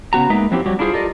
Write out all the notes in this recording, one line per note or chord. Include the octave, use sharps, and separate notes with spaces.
C#3 B3 F#4 A#5
G#3 A#3 D#4 B4 E5
F3 F#3 C4 E4 G4
F#3 G3 F#4 G4
D4 E4 F4 G#4 A4 C5
F4 G4 A4 A#4 D5 D#5